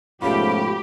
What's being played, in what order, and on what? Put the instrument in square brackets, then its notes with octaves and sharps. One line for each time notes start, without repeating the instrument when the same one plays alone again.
[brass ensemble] G#2 B2 F3 [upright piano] A3 C#4 F4 [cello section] G4 [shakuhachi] B5